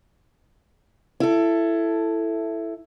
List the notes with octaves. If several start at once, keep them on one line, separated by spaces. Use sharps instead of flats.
E4 A4